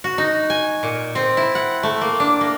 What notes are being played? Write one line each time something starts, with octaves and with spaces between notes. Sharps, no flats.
F#4
D#4
G#5
A#2
C4
E4
F#5
A3
A#3
D4
A#3